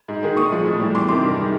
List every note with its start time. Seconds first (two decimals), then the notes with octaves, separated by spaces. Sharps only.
0.08 G#2
0.23 D#3 G#3
0.36 A#2 C#6 D#6
0.52 F3 G#3
0.66 A2
0.80 E3 G3
0.95 E2 C6 D6
1.09 C3 D#3 C6 D6
1.23 G2
1.37 D#3 G#3